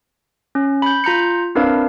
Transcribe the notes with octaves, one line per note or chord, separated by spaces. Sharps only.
C#4
B5 G6
F4 A#5 G6 C#7
C4 D4 E4 A#4 B4 F5